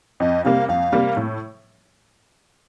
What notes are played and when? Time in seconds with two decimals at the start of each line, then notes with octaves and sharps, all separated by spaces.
0.20 F2 D#5
0.44 C3 G3 A#3 F5
0.68 F2 F5
0.92 C3 G3 A#3
1.17 A2